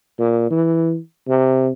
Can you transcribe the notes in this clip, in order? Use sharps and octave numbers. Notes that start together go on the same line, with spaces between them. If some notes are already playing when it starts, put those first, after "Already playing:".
A#2
E3
C3